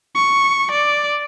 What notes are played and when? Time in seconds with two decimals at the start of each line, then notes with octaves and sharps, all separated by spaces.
0.15 C#6
0.71 D5